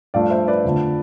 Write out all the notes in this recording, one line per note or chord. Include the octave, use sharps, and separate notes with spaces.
G2 F3 A3 D5 F5
C5 E5
B4 D5
F2 D3 F3 A3